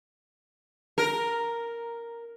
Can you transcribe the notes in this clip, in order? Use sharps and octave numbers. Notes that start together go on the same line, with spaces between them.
A#4